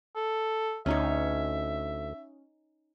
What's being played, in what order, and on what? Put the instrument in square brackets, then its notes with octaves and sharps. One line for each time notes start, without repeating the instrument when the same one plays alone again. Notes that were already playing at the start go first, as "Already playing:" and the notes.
[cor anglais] A4
[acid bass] D2 [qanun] C#4 D#4 C#5 [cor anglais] E5